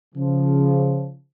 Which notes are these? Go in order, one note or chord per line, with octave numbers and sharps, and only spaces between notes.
C#3 F3